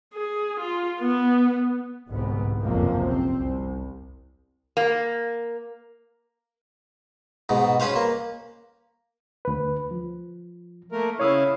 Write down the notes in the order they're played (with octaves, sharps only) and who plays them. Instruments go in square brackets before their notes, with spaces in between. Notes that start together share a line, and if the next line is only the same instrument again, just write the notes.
[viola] G#4
F4
B3
[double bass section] G1 C2 G#2 B3
F#1 B1 F2 C3 A#3
C4
C2
[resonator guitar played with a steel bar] A#3
[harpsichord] G#2 B2
C#4 B4 C5 F5
A#3
[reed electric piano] D2 B4
F3
[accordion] A3 A#3 A#4
[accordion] C#3 E4 F5 [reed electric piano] C#5 D#6 E6